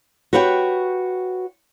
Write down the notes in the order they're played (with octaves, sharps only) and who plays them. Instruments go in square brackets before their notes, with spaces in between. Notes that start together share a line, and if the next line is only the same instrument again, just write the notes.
[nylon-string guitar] F#4 G4 B4 C#5 D#5 G5